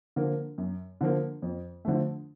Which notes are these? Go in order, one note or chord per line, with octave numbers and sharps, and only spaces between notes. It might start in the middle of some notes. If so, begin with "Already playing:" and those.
D3 F3 A#3
F#2
D3 F3 A#3
F2
D3 F3 A3